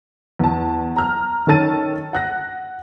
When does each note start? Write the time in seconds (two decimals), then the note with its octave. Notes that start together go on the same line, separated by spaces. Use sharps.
0.39 E2 A5
0.96 A#5 F6
1.47 D#3 C#4 A4 A5 A6 D#7
2.13 F#5 F#6 A#6